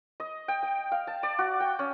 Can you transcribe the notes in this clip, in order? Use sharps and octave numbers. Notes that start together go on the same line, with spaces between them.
D#5
G5
G5
F5
A5
D5
F#4
G5
C#4